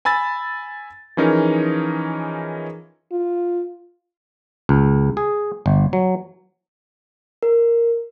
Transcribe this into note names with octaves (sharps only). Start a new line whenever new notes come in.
G#5 B5 E6 A6
E3 F3 C#4 D#4 G#4 A#4
F4
C#2
G#4
G1
F#3
A#4